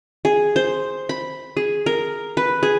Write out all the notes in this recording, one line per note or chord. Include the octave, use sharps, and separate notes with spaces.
G#4
C5
B5
G#4
A#4
B4
G#4